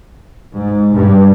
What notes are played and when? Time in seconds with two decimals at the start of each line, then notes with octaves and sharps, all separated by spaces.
0.58 G#2
0.93 G2